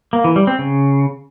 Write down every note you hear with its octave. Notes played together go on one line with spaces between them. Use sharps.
A#3
E3
G3
C4
C#3